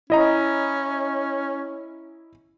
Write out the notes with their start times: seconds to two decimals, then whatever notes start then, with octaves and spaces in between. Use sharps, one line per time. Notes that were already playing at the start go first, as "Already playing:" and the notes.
0.10 C#4 E4 D#5 A#5